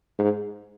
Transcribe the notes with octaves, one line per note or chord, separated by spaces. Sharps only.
G#2